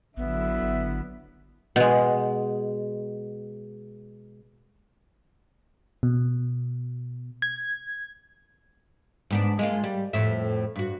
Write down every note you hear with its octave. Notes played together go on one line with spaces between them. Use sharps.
A1 D3 F#3 B3 E4 E5
G#1
B2 G#3
B2
G#6
G#2 B3 D4
G#3 A#3 F4
G3
F2 A2 E5
G2 F#4